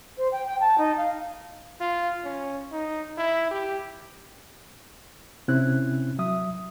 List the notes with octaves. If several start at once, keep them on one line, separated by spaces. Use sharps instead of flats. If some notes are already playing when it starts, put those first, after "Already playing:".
C5
G5
G5
A5
D#4
F5
F4
C#4
D#4
E4
G4
C3 C4 C#4 E4 F#6
F#3 E5 D#6